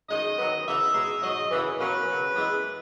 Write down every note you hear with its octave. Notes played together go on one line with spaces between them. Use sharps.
F#2 D#3 G#3 D#5
D#3 F#3 B3
C#3 E3 B3 D#4 E5
B2 G#3 D#4
G#2 D#3 F#3 D#5
F#2 C#3 E3
B2 F#3 A#3 C#4 B4
C#3 F#3 C#4
F#2 E3 G#3 B3